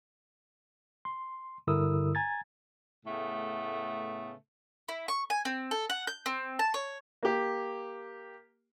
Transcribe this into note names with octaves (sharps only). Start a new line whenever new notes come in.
C6
G2 D3 E4 A#4 D#6 E6
G#5 A#5 G#6 A6
A2 C#3 A3 B3
E4
C#6
G#5
C4
A4
F#5
G6
C4
A5
C#5
A#3 G4